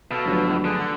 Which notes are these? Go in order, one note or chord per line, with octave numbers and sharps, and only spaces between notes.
B2 A4 F5 A5
G1 F3 F#3 A3
D3 G#4 B4
F#5 E6